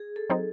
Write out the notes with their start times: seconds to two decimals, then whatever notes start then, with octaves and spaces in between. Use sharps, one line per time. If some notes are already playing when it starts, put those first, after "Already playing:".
Already playing: G#4
0.16 A4
0.30 F#3 C4 D#4